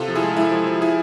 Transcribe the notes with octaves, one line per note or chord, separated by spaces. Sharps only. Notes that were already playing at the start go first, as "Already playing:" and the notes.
Already playing: C3 F4 A4
F3
E4 G#4
G#3
G#3 E4
F3
F3
E4 G#4